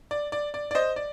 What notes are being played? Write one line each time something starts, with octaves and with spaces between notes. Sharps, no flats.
D5
D5
D5
D5
C5 D#5
D5